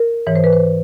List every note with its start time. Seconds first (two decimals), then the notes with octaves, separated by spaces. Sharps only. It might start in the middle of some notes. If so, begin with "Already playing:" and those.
Already playing: A#4
0.27 G#2 E3 C#5
0.35 C5
0.44 B4
0.53 C5